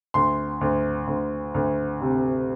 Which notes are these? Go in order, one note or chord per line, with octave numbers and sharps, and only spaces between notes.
D2 C6
D2
D2
D2
C3